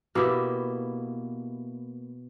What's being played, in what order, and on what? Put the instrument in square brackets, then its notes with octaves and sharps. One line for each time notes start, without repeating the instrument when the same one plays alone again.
[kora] B2 A#3 E4 G4